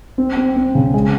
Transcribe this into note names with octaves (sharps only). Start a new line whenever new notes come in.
C4
C4
C4
C#3
G#3